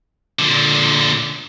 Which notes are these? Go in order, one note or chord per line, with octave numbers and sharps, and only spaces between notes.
A#2 D3